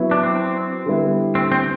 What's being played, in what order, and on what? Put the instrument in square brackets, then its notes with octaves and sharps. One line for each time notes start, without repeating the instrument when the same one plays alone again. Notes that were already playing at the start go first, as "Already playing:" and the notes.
Already playing: [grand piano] F#3 B3 E4
[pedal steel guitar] D4
C4
[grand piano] D3 G3 B3 E4
[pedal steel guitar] C4
C4